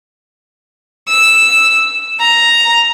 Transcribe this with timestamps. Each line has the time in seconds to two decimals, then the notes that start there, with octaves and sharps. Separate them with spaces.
1.08 E6
2.19 A#5